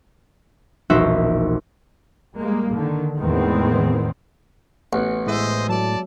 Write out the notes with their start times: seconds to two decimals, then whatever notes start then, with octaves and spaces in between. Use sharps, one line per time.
0.90 E1 A#1 D#4 F#4 C5 E5
2.36 G3 G#3 A#3
2.72 D3 D#3
3.18 E2 A2 D#3 G#3 B3 C4
4.93 A1 B3 F#5
5.27 A2 G#3 G#4 C5 D#5 E5
5.69 F#3 D5 A5